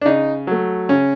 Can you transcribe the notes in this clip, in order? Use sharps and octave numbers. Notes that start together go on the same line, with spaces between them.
D4
C#3 D#4
F#3 A3
C#3 C#4